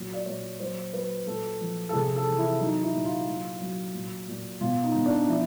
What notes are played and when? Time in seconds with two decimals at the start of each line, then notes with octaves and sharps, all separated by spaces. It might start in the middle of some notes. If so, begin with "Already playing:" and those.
Already playing: A#2 F#3
0.14 D5
0.26 A#2 C#5
0.60 F#3 C5
0.93 F#3 B4
1.27 A#2 A4
1.60 F3
1.89 A4
1.93 C3 G#4
2.16 A4
2.27 E3
2.38 E4
2.60 F#3 D#4
2.83 E4
2.94 A#2
3.05 F4
3.28 F#3
3.61 F#3
3.94 A#2
4.28 A#2
4.61 B2 F4
4.84 D#4
4.95 B2
5.06 D4
5.28 F3 E4